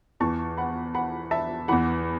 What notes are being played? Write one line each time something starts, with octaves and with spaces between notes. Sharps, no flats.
E2 E3 A5 C#6
F#5 B5
F#5 B5
E5 A5
E2 E3 F#5 B5